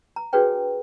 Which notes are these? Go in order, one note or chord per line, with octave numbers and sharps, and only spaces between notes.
A#5
D4 F#4 G#4 B4 C#5 G5